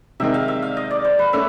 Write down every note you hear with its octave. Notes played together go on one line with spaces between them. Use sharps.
C3 D#3 G#3 C4 D#4 E5
F5
E5
F5
D#5
D5
C5
B4
A3 C#4 E5